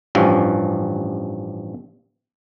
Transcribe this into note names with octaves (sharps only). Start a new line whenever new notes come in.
A1 G2 F3 C#4